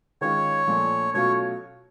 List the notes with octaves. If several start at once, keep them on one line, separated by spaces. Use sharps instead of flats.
D#3 G#3 C#4 F4 C#5
A#2 F3 A3 D4
B2 F#3 A3 C#4 F4 C#5